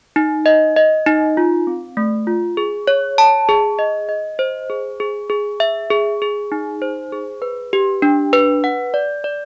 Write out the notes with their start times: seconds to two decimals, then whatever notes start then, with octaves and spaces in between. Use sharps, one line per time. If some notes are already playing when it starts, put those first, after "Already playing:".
0.16 D#4
0.46 D#5
0.76 D#5
1.06 D#4
1.37 F4
1.67 C4
1.97 A3
2.27 F4
2.57 G#4
2.88 C#5
3.18 A5
3.49 G#4
3.79 D#5
4.09 D#5
4.39 C5
4.70 G#4
5.00 G#4
5.30 G#4
5.60 E5
5.91 G#4
6.22 G#4
6.52 D#4
6.82 C5
7.12 G#4
7.42 B4
7.73 G4
8.02 D4
8.33 B4
8.64 F#5
8.94 D5
9.24 D5